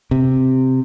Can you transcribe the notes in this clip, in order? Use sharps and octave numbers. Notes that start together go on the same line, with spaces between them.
C3